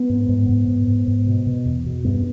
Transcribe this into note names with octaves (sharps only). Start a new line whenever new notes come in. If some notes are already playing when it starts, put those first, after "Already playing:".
Already playing: B3
G#2
G#2
G#2
G#2
G#2
G#2
B2
B2
E2
B2
G2 B3